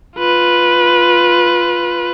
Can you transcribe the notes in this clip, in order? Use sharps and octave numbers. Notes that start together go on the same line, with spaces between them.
F4 B4